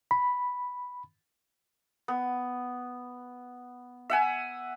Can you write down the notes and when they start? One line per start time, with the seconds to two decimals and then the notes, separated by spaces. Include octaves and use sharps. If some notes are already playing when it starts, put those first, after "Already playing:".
0.11 B5
2.08 B3
4.10 E5 F#5 G#5